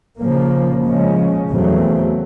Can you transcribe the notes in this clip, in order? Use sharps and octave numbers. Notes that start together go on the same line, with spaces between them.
C#3 F3 A#3
C#3 F3 G#3 C#4
E2 C#3 F#3 A3 C4